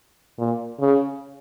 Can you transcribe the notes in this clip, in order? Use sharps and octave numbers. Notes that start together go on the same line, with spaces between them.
A#2
C#3